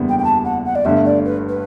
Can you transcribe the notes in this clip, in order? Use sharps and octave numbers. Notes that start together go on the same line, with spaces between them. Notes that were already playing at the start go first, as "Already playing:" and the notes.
Already playing: F#1 E2 D3 G3 B3
G5
G5
A5
F#5
F#5
D5
G1 G2 D3 A3 E5
D5
B4
B4